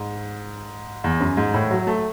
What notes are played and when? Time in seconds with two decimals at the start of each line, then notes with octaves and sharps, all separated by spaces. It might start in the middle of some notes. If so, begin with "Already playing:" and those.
Already playing: G#2
1.04 E2
1.20 F#2
1.37 G#2
1.54 A2
1.71 F#3
1.87 A3